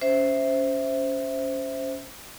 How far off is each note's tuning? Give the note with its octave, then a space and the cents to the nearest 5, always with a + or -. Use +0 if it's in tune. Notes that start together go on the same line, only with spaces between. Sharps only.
C#4 +15 C5 +0 E5 +0